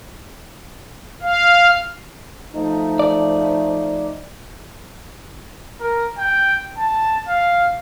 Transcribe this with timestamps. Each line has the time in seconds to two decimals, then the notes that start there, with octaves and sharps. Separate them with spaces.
1.22 F5
2.55 F3 A3 D#4
2.99 D5
5.80 A#4
6.18 G5
6.78 A5
7.28 F5